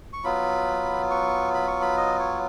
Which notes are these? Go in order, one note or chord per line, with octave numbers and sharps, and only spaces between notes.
C#6
F#3 B3 F4 B5
C#6
B5
C#6
B5
D#5
C#5